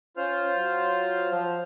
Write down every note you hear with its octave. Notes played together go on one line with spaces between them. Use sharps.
C#4 F4 C5 F6
F#3
F3